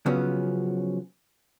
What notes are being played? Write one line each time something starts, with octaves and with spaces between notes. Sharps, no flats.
C#3 F3 F#3 B3 C#4